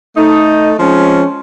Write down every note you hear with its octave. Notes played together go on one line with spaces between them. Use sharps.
A3 D#4
F3 G#3 C4 C#4